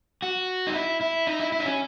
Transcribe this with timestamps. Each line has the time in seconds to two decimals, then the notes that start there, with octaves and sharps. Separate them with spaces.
0.22 F#4
0.67 D#4
0.74 E4
1.01 E4
1.27 D#4
1.40 E4
1.52 E4
1.60 D#4
1.65 C#4